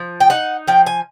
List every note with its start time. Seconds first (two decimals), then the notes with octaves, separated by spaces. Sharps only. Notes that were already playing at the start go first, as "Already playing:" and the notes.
Already playing: F3
0.20 G5
0.30 D#4 F#5
0.68 F3 G5
0.86 G#5